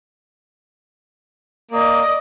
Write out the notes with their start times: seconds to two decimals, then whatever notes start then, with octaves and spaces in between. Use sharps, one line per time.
1.71 A#3 D5 D#5